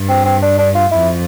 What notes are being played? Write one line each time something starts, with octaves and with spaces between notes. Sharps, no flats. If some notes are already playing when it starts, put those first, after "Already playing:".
Already playing: G2
C4
C4
D4
D4
F4
F2 E4